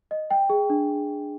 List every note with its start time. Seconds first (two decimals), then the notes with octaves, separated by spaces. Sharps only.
0.11 D#5
0.31 G5
0.50 G#4
0.70 D4